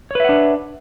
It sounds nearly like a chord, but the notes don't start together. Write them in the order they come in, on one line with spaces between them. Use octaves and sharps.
C#5 B4 E5 F#5 D4